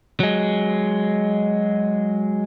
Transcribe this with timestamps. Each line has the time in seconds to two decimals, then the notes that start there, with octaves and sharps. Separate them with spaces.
0.20 F#3 G#3